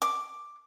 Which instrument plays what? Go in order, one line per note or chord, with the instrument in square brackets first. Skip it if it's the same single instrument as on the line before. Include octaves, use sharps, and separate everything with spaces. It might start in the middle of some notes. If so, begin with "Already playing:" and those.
[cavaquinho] D6